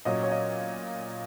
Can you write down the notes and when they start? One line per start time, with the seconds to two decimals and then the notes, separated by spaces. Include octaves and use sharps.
0.05 A#2 F#3 C#4 D#5
0.23 C#5
0.32 D#5